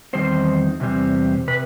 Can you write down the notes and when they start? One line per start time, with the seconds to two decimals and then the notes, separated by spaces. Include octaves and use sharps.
0.13 E2 C3 D#3 G3 C4 C5
0.80 E2 C3 G3 C4
1.48 C3 B4